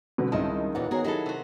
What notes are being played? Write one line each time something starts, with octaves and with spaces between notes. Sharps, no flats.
B2 D3 G3 B3 C4
C#2 D#3 E4 D#5 A5
D#2 A#2 E3 A#4 F#5
B3 F#4 G#4 A#4 C#5 G#5
F#3 D#4 E4 G4 A4 B5
C3 F#4